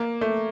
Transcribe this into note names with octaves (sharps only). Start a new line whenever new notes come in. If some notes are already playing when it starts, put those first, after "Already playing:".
Already playing: A#3
A3